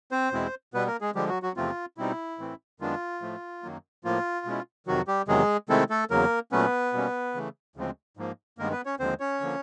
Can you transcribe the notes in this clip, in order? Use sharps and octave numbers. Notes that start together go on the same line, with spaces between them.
C4 C5
E2 B2 G#3 C4 E4
B2 G3 B3 B4
A#3 A#4
G#3 G#4
D3 F3 G3 G#3 G4
F#3 F#4
F#3 F#4
E2 C3 F3 A3 C4 F4
B2 G3 C4 D#4 E4
A2 E3 A3 C4
F#2 D#3 G#3 B3 D4 F4
A2 F3 A3
F#2 D#3 F#3 A#3
A2 F3 A#3 F4
B2 G#3 C#4 E4
F2 C3 D#3 F#3 F#4
G3 G4
E2 C3 D#3 F#3 G#3 G#4
C3 D#3 G#3 A3 C4 E4 A4
A3 A4
E2 C#3 F#3 A#3 A#4
A#2 F#3 A3 B3 C#4 B4
B2 G3 A#3 C#4
C#3 E3 A3
D2 C#3 F3 G#3 C4
G#2 F3 A#3
G2 D#3 G#3 A#3 B3 A#4
B3 B4
C#4 C#5
D#2 D3 F3 G#3 C4 C5
C#4 C#5
D3 F3 A#3